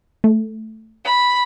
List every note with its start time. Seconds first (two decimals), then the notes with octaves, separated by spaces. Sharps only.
0.24 A3
1.05 B5